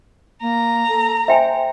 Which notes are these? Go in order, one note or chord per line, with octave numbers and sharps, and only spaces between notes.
A#3 A#5
A4
C5 E5 G5 G#5